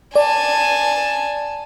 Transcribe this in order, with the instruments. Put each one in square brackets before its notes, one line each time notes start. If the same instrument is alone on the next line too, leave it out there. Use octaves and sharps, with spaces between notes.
[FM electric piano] D5 [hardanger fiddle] G#5 A5